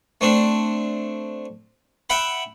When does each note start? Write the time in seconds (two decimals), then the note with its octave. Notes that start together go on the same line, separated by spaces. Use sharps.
0.21 A3 C4 D4
2.10 E5 F#5 G5 B5